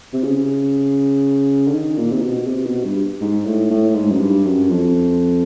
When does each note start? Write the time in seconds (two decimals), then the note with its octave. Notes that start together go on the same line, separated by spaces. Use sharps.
0.13 C3
0.24 C#3
1.68 D3
1.73 D#3
1.98 A#2
2.12 C3
2.22 B2
2.47 C3
2.66 B2
2.84 G2
3.21 G#2
3.45 A2
3.71 A2
3.95 G#2
4.11 F#2
4.19 G2
4.45 F#2
4.70 F2